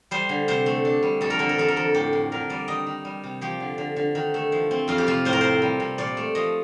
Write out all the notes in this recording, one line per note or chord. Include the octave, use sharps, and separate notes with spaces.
G3 C5
D3
C3 C5
A3
D4
G3
F2 A4
A#4
D3 A4
A#4
F2 A4
A#4
F2 A4
A2 G4
A2
D3 A#4
G3 D5
D#3 D#5
D#3
G3
C3
F3 G4
D3
D3
D3
D#3
A3
F3
C4
F2 F4
G4
C3 F4
A2 C5
A#4
C4 C5
G3
C3
A#2 D5
A3
F3 D#5